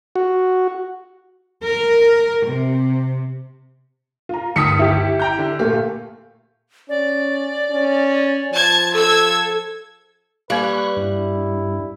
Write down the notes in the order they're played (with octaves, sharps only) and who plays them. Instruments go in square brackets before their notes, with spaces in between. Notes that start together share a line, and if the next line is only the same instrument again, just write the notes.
[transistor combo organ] F#4
[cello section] A#4
C3
[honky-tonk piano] F4 A#5
[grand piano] G1 D2 D#3 [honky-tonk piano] D#6 B6 C#7
[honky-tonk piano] E4 G4
[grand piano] G5 A#5 G6
D3
[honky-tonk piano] A#2 A3 A#3 [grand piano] G4
[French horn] C#4 [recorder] D5
[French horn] C#4
[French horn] F3 [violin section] A5 G#6
[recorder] A4 [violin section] E6 G#6
[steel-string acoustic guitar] G3 [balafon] A#3 F5 [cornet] B4 [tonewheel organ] C#6 F#6
[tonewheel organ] G2 [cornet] E4